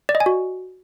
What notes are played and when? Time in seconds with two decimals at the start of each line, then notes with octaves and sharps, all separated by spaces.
0.09 D5
0.15 D#5
0.20 G#5
0.26 F#4